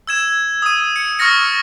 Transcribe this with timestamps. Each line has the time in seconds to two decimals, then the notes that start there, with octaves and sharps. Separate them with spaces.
0.07 E6 G#6 E7
0.62 D#6 D#7
0.96 C#7
1.19 C#6 D#6 F6 A6 A#6 C#7